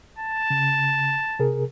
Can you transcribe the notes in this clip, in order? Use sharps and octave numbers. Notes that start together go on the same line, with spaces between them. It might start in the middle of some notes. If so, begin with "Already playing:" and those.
A5
C#3
C3 G#4 A#4